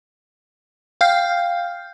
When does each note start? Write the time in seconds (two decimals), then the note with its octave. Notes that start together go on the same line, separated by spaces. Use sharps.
1.01 F5 G5 F6 G6 C7